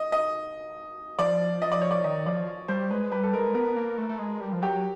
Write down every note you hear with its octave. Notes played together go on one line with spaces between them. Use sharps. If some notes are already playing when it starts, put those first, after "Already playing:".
Already playing: D#5
D#5
F3 D5
D#5
D5
C#5
D5
D#3 D#5
F3 D5
G3 C5
G#3 B4
G3 B4
A4
G#3 A#4
B3 A#4
A#3
A3
A3
G#3
G3
F3
F#3 G4